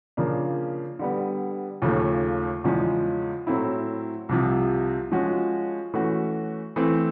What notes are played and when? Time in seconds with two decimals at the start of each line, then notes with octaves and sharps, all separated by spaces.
0.17 C#3 F3 A#3 D4
0.99 D3 G3 B3
1.82 D#2 C#3 F3 A3
2.64 E2 C#3 F3 G#3 C#4
3.47 A2 F#3 A3 C4 E4
4.29 C2 C3 F3
5.11 F3 G#3 C#4 F#4
5.94 E3 A3 C#4 F#4
6.76 E3 A3 C4